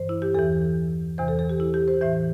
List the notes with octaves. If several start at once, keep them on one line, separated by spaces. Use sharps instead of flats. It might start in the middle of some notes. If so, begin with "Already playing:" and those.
Already playing: G2 E3 C5
E4
G4
E2 E3 A4
E2 C3 E3 C5
A4
A4
G4
E4
G4
C5
A2 E3 E5